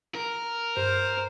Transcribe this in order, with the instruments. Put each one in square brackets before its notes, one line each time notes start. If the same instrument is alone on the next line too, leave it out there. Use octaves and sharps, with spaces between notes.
[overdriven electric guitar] A#4
[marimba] G2 [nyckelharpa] C5